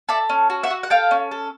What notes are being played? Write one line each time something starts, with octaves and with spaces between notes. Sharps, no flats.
A4 D5 E5
C#4
F#4
E5 F#5
F#4
F#5
A4 F5 G5
C#4
A4